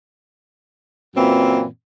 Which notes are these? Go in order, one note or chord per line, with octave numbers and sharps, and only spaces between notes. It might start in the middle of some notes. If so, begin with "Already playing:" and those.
F#2 A#2 E3 C4